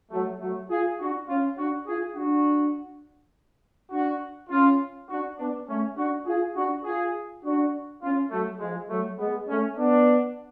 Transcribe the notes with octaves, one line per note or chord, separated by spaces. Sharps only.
F#3 A3
F#3 A3
F4 G#4
D4 F#4
C#4 F4
D4 F#4
F4 G#4
D4 F#4
D4 F#4
C#4 F4
D4 F#4
B3 D4
A3 C#4
D4 F#4
F4 G#4
D4 F#4
F4 G#4
D4 F#4
C#4 F4
F#3 A3
F3 G#3
F#3 A3
G#3 B3
A3 C#4
B3 D4